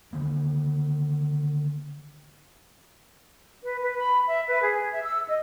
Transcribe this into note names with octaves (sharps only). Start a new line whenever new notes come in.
D3 D#3 A#3
B4
B4
B5
E5
B4
G#4
E5
E6
D#5